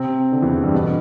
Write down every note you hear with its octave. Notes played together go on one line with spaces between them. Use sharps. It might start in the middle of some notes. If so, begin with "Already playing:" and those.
Already playing: C3 C4
D3
E2 E3
G2 G3
B2 B3